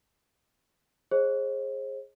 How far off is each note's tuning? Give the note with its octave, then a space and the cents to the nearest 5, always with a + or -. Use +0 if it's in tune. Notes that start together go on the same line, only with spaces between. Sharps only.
G#4 +0 C5 +35 D#5 +0